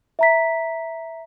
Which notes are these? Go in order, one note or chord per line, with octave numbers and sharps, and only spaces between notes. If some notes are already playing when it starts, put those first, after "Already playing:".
E5 A#5 B6